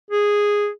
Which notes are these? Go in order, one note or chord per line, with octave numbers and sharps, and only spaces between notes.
G#4